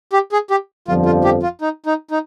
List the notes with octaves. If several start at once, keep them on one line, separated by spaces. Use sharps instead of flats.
G4
G#4
G4
G1 F2 D3 F3 F4
F4
G4
F4
D#4
D#4
D#4